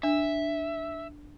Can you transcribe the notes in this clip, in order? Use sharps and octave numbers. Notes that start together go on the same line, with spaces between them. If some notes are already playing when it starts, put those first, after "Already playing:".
D4 E5